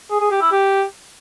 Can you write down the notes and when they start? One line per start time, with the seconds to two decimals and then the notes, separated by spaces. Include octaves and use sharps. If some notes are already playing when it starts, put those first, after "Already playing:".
0.10 G#4
0.20 G#4
0.31 G4
0.41 E4
0.52 G4